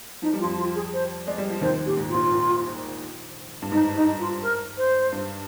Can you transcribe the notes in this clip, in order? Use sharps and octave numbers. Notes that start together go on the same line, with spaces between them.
F3 D#4
G3
F4
F2 F3
F4
G#4
C5
G#3 D5
G3
F3
D#2 D#3 C5
A#2 G4
G#2
F4
A#1 A#2
A#1 A#2
G2
G#2 D#4
D#4
F4
A#4
C5
G2